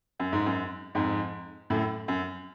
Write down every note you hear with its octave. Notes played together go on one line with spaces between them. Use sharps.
F#2
G#2
F#2
F2 G#2
F#2 A2
F#2